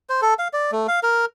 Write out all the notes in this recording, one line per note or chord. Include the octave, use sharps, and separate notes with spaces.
C5
A4
F5
D5
A3
F5
A#4